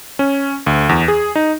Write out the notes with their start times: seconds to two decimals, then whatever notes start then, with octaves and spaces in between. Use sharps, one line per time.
0.19 C#4
0.67 D2
0.89 E2
1.08 G#4
1.35 D#4